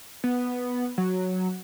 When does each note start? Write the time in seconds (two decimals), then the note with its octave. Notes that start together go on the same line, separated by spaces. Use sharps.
0.24 B3
0.98 F#3